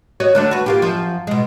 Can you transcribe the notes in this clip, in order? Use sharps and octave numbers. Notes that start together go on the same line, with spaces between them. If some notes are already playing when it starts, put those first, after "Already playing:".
F#4 C#5 D#5
D3 A3 D4
F#4 B4
A#3 F4 G4
F#2 F3
B2 G#3